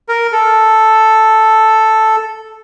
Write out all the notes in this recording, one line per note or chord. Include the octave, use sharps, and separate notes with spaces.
A#4
A4